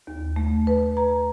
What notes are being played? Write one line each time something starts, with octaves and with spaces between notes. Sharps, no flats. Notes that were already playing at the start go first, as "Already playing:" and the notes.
D#2
A3
B4
A#5